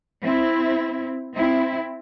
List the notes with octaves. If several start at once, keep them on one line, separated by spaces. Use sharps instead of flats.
C4 E4
C4 E4